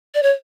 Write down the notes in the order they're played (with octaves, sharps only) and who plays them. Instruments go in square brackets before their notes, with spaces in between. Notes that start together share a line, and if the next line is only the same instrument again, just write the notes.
[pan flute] D5
C#5